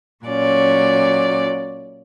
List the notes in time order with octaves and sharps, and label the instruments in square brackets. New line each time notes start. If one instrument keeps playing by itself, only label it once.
[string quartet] A#2 F#3 C#4 D5